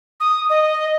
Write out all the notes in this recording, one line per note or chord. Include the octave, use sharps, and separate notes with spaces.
D#6
D#5